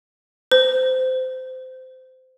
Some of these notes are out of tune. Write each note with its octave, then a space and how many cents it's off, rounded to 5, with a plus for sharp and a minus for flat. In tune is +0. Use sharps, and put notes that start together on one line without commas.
C5 -20